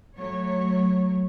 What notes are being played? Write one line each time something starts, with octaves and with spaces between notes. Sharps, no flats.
F#3 A3 C#5